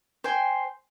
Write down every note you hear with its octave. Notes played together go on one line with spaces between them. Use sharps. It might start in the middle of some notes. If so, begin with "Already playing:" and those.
C5 G5 G#5